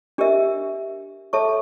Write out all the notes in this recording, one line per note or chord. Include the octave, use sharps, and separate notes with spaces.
D4 G4 A#4 E5
A4 C#5 E5 A5 C#6